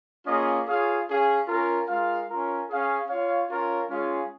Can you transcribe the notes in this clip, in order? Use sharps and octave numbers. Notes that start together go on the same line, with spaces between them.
A#3 C#4 F4 G#4 D#5
F4 G#4 C#5 F5
C#4 G#4 F5
C#4 F4 A#4
G#3 F4 A#4 F5
C#4 F4 A#4
C#4 G#4 F5
F4 C#5 F5
C#4 F4 A#4 C#5 F5
G#3 C#4 F4 G#4 F5